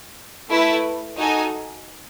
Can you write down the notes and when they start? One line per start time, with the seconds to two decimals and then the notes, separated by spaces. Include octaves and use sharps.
0.51 A3 E4 B4
1.16 D#4 F#4 A4 D#5 G#5